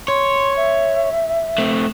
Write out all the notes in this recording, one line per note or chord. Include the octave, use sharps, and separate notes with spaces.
C#5 C6
E5
A3 C4